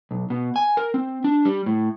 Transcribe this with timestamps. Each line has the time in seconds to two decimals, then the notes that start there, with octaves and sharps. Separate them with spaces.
0.11 B1
0.30 B2
0.56 G#5
0.77 A#4
0.94 C4
1.24 D4
1.45 G3
1.66 A2